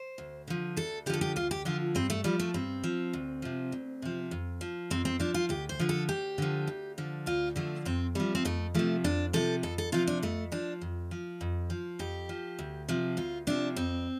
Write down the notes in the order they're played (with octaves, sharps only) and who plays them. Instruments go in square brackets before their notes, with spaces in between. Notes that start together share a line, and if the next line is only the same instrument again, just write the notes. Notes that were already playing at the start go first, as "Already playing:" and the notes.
Already playing: [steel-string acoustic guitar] C5
D2
D3 F3
D2 A4
D3 G4
F3 A4
G4
D2 F4
G4
D3 F3 F4
G2 C4
A3
F3 G3
A3
G2 C4
F3
D2
C3 F3
D2
C3 F3
F2
F3
F2 C4
C4
F3 D4
F4
D2 G4
C5
D3 F3
A4
D2 G4
D3 F3
D2
D3 F3
D2 F4
D3 F3 A3
F2 C4
C3 F3 G3
C4
F2 A3
C3 F3 A3
F2 D4
C3 F3 A4
F2 A4
A4
C3 F3 F4
D4
F2 A3
F3 D4
F2
F3
F2
F3
F2 G4
F3
D2
C3 F3
D2 F4
C3 F3 D4
F2 C4